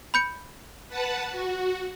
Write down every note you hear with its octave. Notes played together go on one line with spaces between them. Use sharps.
B5 G6 C#7
B4 F#5 A5
F#4